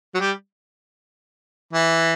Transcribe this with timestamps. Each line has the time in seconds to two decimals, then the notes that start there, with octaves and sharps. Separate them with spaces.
0.14 F#3
0.20 G3
1.73 E3